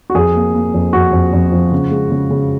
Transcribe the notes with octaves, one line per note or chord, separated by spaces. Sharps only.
F#4
F2 G#4
A#3
A#3
F2
F2 F#4
F2
F2
F3
C#3
G#3
C#3
C#3